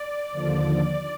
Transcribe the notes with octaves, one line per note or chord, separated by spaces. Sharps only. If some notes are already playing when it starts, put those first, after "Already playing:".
Already playing: D5
D#2 D3 F3